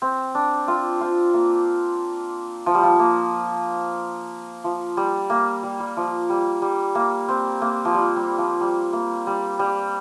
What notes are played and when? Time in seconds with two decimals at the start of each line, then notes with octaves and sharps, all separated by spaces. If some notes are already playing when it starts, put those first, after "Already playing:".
0.02 C4
0.35 D4
0.68 C4 F4
1.01 C4 F4
1.34 A#3
2.66 F3
2.75 G3
2.83 F3
2.99 A#3
4.64 F3
4.97 G3
5.30 A#3
5.63 G3
5.80 G3
5.97 F3
6.30 G3
6.62 G3
6.95 A#3
7.29 C4
7.62 A#3
7.85 F3
7.94 G3
8.16 G3
8.38 F3
8.60 G3
8.93 A#3
9.27 G3
9.59 G3